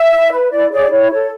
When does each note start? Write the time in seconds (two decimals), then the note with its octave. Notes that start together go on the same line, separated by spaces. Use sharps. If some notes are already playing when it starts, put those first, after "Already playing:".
Already playing: E5
0.13 E4
0.33 B4
0.52 E4 D5
0.72 G#4 C#5 D5
0.91 E4 C#5
1.12 A4 C#5